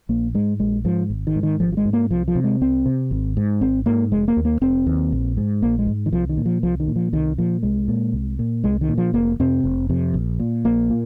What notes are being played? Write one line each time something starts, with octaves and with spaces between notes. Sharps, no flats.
A#1 A#3
G#2 G#3
A#1 G#3
G#2 F3
G#1
D#3
G#2
D#3
G#1 F3
F3
G#3
G#2
A#3
C2 F3
F3
C3
G#3
C2 C4
C3
G#1
G#2
G#1 C4
G#2 A#3
F1 G#3
A#3
D#2
A#3
F1 C4
D#2
A#1
G#2
A#1 A#3
G#3
G#2
D#3
C2 F3
D#3
A#2
F3
C2 F3
D#3
A#2
F3
C2 D#3
A#2 F3
C2 G#3
A#2
C2
A#2
C2 G#3
D#3
A#2
F3
F1 A#3
F2 C3 C4
F1
F2 C3
A#1
A#2
A#1 A#3
A#2